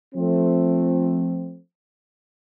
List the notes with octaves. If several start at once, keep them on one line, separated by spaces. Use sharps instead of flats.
F3 A3 C4